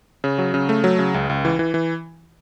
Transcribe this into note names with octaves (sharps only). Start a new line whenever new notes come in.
C#3
F#3
C#3
A3
F#3
C#3
C#2
C#2
E3
E3
E3